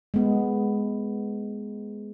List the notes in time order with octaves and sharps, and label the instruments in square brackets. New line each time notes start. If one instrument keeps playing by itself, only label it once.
[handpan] G#3 B3